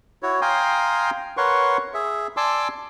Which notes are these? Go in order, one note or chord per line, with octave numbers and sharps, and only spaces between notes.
E4 F#4 C#5
F5 G5 G#5 A#5 C6 D#6
A#4 B4 C#5 F#5 C6 C#6
G#4 E5
D5 G#5 A5 C6 D6 E6